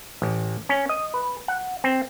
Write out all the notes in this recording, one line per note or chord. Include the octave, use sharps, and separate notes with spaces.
A1
C#4
D#5
B4
F#5
C4